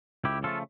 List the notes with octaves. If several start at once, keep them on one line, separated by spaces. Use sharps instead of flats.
C#2 E4 G4
C#3 F3 A3 F4 A4